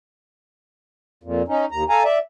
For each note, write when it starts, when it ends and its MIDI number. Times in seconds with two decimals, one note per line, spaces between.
1.23 1.42 41
1.23 1.42 46
1.48 1.65 61
1.48 1.65 63
1.71 1.84 39
1.71 1.84 82
1.89 2.03 69
1.89 2.03 77
1.89 2.03 80
1.89 2.03 82
2.04 2.18 74
2.04 2.18 76